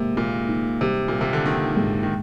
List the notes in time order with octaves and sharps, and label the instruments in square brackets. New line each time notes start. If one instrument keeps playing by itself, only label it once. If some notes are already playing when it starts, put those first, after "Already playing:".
Already playing: [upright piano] G#2 A#3 [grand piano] C3
[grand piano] A#2 [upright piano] A#3
[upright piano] D#4
[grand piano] C3 [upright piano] G3
[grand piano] A#2 [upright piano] G3
[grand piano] C3
D3
[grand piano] D#3 [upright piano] D#4
[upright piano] G#2
[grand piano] D#3